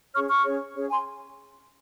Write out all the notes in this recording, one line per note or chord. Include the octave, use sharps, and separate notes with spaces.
C#4 G#4 C#5 C#6 F6
C#6 F6
C#4 G#4 C#5
C#4 G#4 C#5
G#5 C6